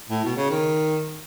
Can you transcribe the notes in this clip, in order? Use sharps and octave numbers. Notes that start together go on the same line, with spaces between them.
A2
B2
C#3
D#3